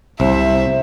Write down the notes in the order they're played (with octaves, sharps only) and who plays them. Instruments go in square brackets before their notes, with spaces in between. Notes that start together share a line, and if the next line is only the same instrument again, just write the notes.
[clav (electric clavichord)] C2 [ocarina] C5 [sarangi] E5